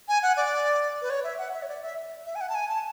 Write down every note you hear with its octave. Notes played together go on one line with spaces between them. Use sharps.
G#5
F#5
D5
B4
C#5
E5
F#5
E5
C#5
D5
E5
E5
G#5
F#5
A5
G#5
A5